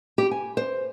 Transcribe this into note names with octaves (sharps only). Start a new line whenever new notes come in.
G4
G#5
C5